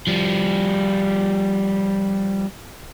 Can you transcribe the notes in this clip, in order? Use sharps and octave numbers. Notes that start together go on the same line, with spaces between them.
F3 G3